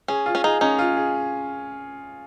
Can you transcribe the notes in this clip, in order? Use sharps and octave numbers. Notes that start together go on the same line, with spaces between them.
C#4 G#4
F4
C#4
D#4 G#4
C#4 D#4
F4
G#4